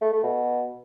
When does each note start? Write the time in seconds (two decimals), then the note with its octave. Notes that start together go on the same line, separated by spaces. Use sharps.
0.02 A3
0.12 A3
0.23 B2